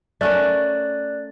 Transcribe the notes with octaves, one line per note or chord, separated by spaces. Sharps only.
A3 C#4 A#4 D5 F#6